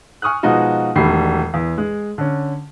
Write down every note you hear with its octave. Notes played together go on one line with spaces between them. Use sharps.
G#5 C#6 D#6 F6 F#6
B2 F3 G#3 D#4 F4 F#4
E1 D#3 G3 A3 B5 C7
E2
G#3
D3 C#4